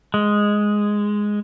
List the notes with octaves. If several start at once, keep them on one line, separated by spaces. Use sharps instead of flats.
G#3